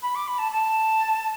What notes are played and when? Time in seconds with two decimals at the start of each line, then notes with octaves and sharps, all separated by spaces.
0.02 B5
0.15 D6
0.27 B5
0.38 A5
0.51 A5